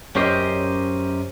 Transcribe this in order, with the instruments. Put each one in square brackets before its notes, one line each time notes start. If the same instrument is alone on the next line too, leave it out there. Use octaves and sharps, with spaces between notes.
[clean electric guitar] F#2 C#4 G4 C5 D#5